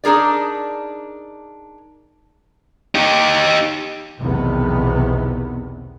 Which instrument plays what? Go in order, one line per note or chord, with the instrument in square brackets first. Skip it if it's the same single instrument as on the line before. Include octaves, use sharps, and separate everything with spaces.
[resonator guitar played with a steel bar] D4 D#4 G#4 A#4 D5
[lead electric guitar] D#4 G4
[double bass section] B1 E2 C3 D#3 B3